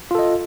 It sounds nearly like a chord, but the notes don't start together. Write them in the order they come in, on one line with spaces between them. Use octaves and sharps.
F4 A4 D#5